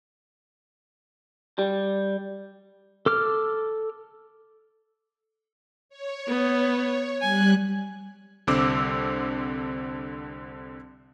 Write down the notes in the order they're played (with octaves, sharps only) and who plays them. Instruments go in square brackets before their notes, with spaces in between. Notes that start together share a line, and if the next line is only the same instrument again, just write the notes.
[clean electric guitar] G3
[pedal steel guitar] A4 D6 F6
[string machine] C#5
[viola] B3
[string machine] G3 F#6 [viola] G#5
[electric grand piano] C2 D3 C4 D6 E6